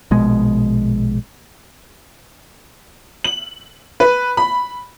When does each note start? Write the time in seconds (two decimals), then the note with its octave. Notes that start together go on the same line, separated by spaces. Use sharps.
0.11 A#1 B2 G#3
3.24 F#7
4.00 B4
4.37 B5